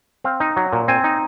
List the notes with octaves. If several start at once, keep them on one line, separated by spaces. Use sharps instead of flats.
C4 F5
D#4
F#3
A#2
C4 G#5
D#4